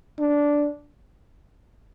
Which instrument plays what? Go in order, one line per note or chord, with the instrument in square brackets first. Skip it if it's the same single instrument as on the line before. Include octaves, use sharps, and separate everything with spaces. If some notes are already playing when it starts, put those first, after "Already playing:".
[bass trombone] D4